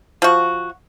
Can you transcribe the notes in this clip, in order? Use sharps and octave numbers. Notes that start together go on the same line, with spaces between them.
F3 F#4